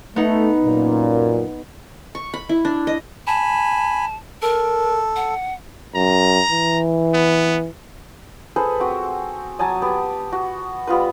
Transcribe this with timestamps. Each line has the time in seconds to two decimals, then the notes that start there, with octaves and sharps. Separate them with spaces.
0.16 A3 B3 D#4
0.65 F#2 A#2
2.15 C#6
2.34 B5
2.49 E4
2.65 D4
2.87 D#5
3.27 G#5 A5 B5
4.42 A4 A#4
5.16 F#5
5.96 F#2 A#5
6.52 E3
7.14 B3
8.56 G#4 A4 B4 C5
8.80 C4 F#4
9.59 F#3 G#5 A5 D#6
9.82 B3 G4
10.32 F#4
10.87 G3 B3 F4 B4